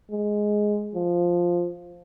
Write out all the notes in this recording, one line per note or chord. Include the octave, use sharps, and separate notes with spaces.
G#3
F3